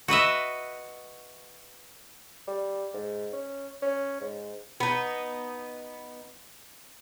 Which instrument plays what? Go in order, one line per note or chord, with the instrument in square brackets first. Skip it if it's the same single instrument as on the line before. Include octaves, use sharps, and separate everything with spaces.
[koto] F#4 B4 D#5 E5
[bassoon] G3
G#2
C#4
C#4
G#2
[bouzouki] B3 D#4